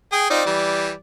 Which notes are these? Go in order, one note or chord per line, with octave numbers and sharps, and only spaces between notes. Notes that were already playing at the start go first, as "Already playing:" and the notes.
G#4 G5 D#6
C4 D#4 F4 D5
E3 G3